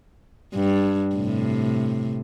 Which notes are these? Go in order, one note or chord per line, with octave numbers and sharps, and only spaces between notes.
G2
A2 C3